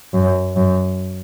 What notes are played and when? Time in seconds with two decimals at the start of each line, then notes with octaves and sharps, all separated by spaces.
0.13 F#2
0.56 F#2